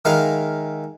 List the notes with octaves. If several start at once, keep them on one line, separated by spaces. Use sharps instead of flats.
D#3 G#3 E4 A#4 F5